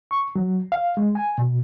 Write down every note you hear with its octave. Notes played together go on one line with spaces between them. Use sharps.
C#6
F#3
F5
G#3
G#5
B2